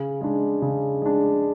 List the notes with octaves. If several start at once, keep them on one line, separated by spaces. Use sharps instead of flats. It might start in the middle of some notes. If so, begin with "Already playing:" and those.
Already playing: C#3
G#3 D4
C#3
G#3 D4